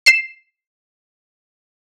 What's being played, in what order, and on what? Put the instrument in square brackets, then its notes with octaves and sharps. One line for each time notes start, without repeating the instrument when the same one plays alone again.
[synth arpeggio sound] C7 E7